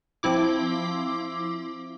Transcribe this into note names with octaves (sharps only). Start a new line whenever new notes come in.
F3 C4 E4 D6